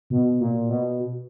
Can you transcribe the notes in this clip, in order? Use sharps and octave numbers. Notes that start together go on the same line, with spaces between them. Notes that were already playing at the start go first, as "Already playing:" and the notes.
B2
A#2
B2